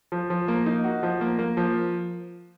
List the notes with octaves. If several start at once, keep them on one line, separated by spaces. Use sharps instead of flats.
F3
F3
A#3
D#4
F#4
F3
A#3
A#3
F3